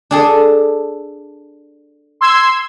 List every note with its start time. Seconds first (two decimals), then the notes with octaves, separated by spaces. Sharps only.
0.11 D4 G#4 A4
2.21 C6 E6 G#6